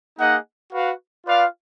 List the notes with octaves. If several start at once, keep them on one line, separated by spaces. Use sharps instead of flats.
A#3 D#4 G#4 D#5 F#5
F#4 B4 F5
F4 B4 D5 F5